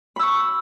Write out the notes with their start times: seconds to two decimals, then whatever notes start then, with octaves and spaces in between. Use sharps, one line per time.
0.16 B5
0.19 E6
0.23 C#6